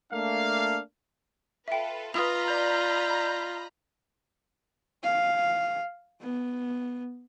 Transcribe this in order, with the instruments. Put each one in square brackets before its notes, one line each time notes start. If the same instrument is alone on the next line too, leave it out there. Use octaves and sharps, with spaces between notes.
[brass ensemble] A3 A#3 D4 F5
[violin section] F4 A4 B4 [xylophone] E5 G5
[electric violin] F4 [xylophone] B4 D#6 F7 [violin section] D#5 A#5 B5
[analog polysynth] D5 G6
[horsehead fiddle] F5
B3